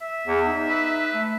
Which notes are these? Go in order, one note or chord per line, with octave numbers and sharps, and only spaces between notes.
E5
E2
D#4
B4
A3